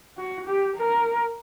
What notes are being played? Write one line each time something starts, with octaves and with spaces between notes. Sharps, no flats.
F#4
G4
A#4